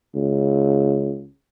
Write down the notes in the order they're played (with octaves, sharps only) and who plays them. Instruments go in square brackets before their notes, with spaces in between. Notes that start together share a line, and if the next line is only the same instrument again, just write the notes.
[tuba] C#2